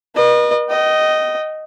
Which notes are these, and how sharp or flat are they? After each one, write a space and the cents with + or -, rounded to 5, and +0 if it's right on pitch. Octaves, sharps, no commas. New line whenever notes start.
B4 -45 D#5 -35
D#5 +0 G5 -35